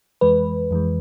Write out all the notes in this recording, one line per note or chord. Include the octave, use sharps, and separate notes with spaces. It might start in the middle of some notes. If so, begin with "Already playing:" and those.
F2 E3 G#3 B4
F2 E3 G#3